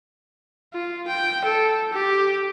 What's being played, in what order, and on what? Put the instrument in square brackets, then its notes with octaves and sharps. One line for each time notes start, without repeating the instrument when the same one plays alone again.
[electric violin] F4
G5
A4
G4